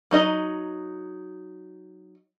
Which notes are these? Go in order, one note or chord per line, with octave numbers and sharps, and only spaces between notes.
F#3 D#4 D#5